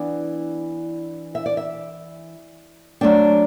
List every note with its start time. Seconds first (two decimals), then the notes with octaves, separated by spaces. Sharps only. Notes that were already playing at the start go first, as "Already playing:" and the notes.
Already playing: E3 B3 D4 D5
1.35 E5
1.46 D5
1.57 E5
3.01 F#3 A3 D4 G5